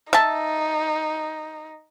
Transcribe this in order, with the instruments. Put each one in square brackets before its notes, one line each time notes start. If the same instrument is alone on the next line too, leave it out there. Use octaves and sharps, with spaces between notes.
[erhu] D#4 [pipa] E5 A5